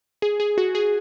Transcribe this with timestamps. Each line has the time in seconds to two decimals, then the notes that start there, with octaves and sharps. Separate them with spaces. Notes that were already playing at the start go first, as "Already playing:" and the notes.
0.22 G#4
0.40 G#4
0.58 F#4
0.75 G#4